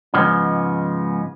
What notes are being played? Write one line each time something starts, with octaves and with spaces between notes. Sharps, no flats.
G#2 C#3 F3 G#3 B3